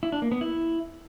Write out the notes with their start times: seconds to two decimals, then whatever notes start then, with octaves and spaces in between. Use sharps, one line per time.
0.03 E4
0.12 D4
0.22 A#3
0.32 B3
0.41 E4